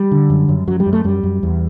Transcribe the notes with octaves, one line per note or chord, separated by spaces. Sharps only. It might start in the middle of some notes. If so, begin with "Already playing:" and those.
Already playing: G3
D3
F#2
F#2
F#2 F#3
G3
F#2
A3
F#2 G3
F#2
E2